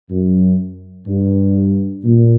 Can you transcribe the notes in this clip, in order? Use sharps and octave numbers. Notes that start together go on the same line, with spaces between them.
F#2
G2
A#2